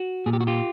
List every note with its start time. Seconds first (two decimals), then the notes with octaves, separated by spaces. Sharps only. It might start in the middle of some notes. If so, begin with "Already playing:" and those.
Already playing: F#4
0.26 A#2 G#4
0.33 G4
0.41 F#4
0.47 F4 G4